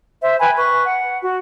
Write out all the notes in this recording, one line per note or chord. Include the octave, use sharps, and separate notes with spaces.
C5 E5
B4 G5 G#5 B5
B4 C#6
F#5
F#4